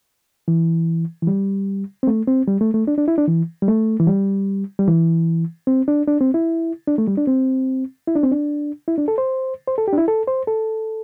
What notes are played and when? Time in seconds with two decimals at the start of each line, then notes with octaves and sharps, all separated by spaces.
0.48 E3
1.22 E3
1.27 G3
2.03 C4
2.07 A3
2.27 C4
2.47 G3
2.61 A3
2.74 A3
2.87 D4
2.98 D4
3.08 E4
3.18 D4
3.27 E3
3.62 G3
3.68 A3
4.00 E3
4.07 G3
4.79 G3
4.88 E3
5.67 C4
5.88 D4
6.08 D4
6.21 C4
6.34 E4
6.88 D4
6.98 A3
7.08 G3
7.18 D4
7.27 C4
8.07 E4
8.15 D4
8.23 C4
8.31 D4
8.88 E4
8.98 D4
9.08 A4
9.18 C5
9.68 C5
9.78 A4
9.88 G4
9.93 D4
9.98 E4
10.08 A4
10.28 C5
10.47 A4